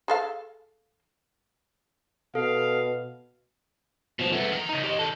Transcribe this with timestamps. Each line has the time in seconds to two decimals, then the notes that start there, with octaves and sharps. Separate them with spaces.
0.08 G#4 A4 F5
2.35 B2 A4 F5
4.19 B2 F3
4.32 A3 B3
4.52 D#3 A#5
4.69 C#3 D#4
4.84 G4 D#5
4.99 D#3 A4